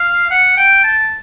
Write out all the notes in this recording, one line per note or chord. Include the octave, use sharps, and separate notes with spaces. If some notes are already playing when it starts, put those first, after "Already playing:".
Already playing: F5
F#5
G5
A5